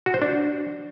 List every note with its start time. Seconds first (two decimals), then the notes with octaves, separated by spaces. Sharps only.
0.06 F#4
0.14 C5
0.22 D4